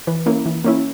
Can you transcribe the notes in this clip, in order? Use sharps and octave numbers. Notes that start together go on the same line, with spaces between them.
E3 B4
A#3 C#4 E4
E3
A#3 C#4 E4